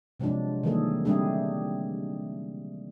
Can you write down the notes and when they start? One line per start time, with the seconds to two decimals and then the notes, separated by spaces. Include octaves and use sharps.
0.20 C3 F3 F#3 G#3 D4
0.63 D#3 E3 G3 A#3 G#4 A4
1.05 D3 G3 A3 C4 D4 G#4